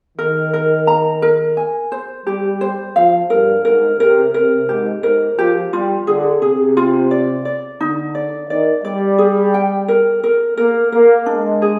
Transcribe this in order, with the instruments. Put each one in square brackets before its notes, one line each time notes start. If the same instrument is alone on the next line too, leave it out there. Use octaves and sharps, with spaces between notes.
[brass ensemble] D#3 [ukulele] A#4
[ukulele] A#4
A#5
A#4
G#5
C5
[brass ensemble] G3 [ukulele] G4
[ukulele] C5
[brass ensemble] F3 [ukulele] F5
[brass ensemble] G2 [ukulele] A#4
[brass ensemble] G#2 [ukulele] A#4
[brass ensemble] C3 [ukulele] A#4
[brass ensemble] C3 [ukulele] A#4
[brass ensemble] G#2 [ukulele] G4
[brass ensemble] G#2 [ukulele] A#4
[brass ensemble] F3 [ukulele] G4
[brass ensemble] G3 [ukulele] F4
[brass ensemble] D3 [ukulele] G#4
[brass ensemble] C3 [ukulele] G#4
[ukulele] F4
D5
D5
[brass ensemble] D3 [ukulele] D#4
[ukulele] D5
[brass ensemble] D#3 [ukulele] D5
[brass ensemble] G3 [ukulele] D5
[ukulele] G#4
G5
A#4
A#4
[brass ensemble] A#3 [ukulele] A#4
[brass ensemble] A#3 [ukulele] A#4
[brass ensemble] G#3 [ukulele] D4
[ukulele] G#4